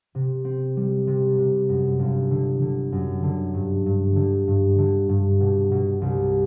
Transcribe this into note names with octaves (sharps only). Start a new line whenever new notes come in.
C3
C4
G3
C3
C3
F#2
G1
D3
D3
F#2
D3
G2
G2
D3
G2
D3
G2
B2
B2
C2